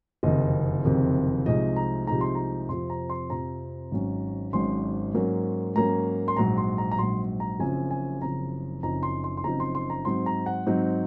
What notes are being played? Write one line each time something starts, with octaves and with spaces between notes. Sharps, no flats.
F#1 F2 C3 D#3 D#5
F#1 F2 C3 D#3
C2 C3 F3 G#3 D#4 D#5
A#5
C2 C3 F3 G#3 D#4 A#5
C6
A#5
F2 C3 F3 C4 C6
A#5
C6
F2 C3 F3 C4 A#5
G#1 G#2 F#3 C#4
G#1 G#2 F#3 C#4 C6
G#2 F#3 A#3 C#4
G#2 F#3 A#3 C#4 A#5
C6
A#1 G#2 F#3 A#5
C6
A#5
A#5
A#1 G#2 F#3 C6
A#5
F#1 F#2 F3 C4 G#5
G#5
F#1 F#2 F3 C4 A#5
F#1 F#2 F3 C4 D#4 A#5
C6
C6
C6
F#1 F#2 F3 C4 D#4 A#5
C6
C6
A#5
G#2 F#3 C4 D#4 C6
A#5
F#5
G#2 F#3 C4 D#4